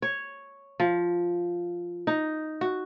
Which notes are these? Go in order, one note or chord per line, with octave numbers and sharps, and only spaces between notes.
C#5
F3
D#4
F#4